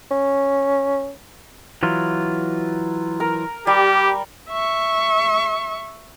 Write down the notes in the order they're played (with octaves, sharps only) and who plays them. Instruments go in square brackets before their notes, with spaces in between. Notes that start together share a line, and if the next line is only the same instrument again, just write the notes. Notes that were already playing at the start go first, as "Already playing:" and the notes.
[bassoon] C#4
[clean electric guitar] E3 F#3 F4
[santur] A#4
[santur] G3 [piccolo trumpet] G4
[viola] E5 C#6